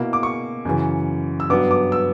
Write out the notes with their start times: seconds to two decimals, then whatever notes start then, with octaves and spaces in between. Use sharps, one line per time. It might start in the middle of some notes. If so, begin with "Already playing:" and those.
Already playing: B2 A#3 E4
0.13 D6
0.23 C#6
0.65 F#2 C#3 E3
1.40 E6
1.50 G2 F#3 B3 D4 D6
1.71 D6
1.92 E6